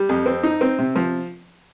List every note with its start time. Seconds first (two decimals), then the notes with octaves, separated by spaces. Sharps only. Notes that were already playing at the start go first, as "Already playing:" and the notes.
Already playing: G3
0.09 F2
0.26 C4
0.43 D#4
0.61 C4
0.79 C3
0.95 F3